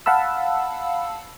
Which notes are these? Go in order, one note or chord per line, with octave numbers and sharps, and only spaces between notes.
F5 F#5 A5 B5 E6